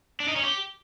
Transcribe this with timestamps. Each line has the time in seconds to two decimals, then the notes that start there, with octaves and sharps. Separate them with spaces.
0.20 D4
0.28 D#4
0.36 C#4
0.44 G4